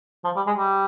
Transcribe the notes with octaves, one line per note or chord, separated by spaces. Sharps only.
F3
G3
G#3
G3